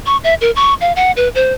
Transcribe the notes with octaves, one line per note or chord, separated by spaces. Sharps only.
C#6
E5
A#4
C#6
F5
F#5
B4
C5